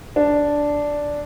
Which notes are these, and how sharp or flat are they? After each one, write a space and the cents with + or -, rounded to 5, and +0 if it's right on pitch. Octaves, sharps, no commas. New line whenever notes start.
D4 -5